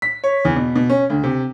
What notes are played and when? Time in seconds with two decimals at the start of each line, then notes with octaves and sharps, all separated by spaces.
0.02 B6
0.24 C#5
0.45 E2
0.56 B2
0.75 B2
0.89 C#4
1.10 D2
1.24 C3